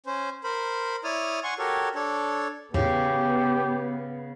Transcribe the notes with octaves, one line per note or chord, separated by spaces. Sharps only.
C#4 C5
A#4 C5 B5
E4 C#5 D5 D#6 F6
F#5 G#5 C6 C#6
F#4 G4 A4 A#4 C#5
D4 A4 C#5
E2 A2 C#3 B3 G4